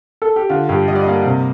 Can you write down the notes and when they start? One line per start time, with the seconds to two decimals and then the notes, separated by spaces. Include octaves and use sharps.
0.22 A4
0.36 G4
0.49 D3 F4
0.69 G2 G4
0.88 G3 D#5
0.95 D5
1.03 A#3 D#5
1.25 C3